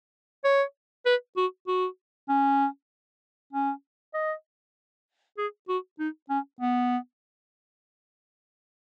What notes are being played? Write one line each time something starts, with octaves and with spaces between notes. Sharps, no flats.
C#5
B4
F#4
F#4
C#4
C#4
D#5
G#4
F#4
D#4
C#4
B3